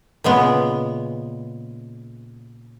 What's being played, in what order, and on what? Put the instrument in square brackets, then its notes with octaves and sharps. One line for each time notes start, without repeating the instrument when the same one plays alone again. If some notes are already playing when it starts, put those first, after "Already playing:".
[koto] A#2 C#3 G#3 B3